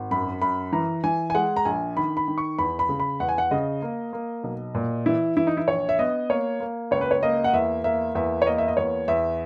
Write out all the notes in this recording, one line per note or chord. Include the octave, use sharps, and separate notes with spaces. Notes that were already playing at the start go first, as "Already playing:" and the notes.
Already playing: G#1
F#2 B5
F#2 B5
E3 A#5
E3 G#5
G#5
G#3 F#5
A#5
A#1 G#5
D#3 B5
B5
D#3
C#6
E2 B5
B5
C#3
B5
E2 F#5
G#5
F#5
C#3 D#5
A#3
A#3
B1
A#2
E3 E4
E3 E4
D#4
E4
A#1 C#5
E5
B3 D#5
A#3 C#5
A#3
C#2 C#5
B4
C#5
A#3 D#5
F#5
E2 E5
A#3 E5
E2 E5
C#5
A#3 D#5
E5
D#5
E2 C#5
E2 E5